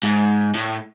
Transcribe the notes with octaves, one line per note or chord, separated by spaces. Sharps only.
G#2
A2